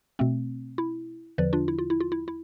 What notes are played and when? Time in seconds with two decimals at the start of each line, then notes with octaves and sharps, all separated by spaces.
0.19 B2 A3 C4
0.78 E4
1.38 E2 D3 F3 B4 D5
1.53 D4 F4
1.68 E4
1.79 F4
1.90 E4
2.00 F4
2.12 E4
2.28 E4